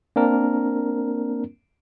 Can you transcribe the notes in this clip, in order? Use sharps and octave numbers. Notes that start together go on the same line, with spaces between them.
A#3 C4 D4 A#4